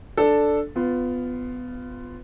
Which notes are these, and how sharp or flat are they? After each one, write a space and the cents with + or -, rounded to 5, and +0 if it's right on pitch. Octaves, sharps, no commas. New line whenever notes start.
D4 +0 A4 +0
B3 +20 F4 +0